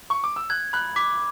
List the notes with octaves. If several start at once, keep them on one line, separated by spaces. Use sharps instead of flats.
C#6
D6
E6
F#6 G#6
B5 F#6
D6 B6